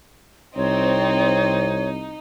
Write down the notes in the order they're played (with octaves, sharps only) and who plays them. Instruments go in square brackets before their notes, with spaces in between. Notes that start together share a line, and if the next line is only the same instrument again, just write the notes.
[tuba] C2 [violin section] C4 [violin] D#4 [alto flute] C#5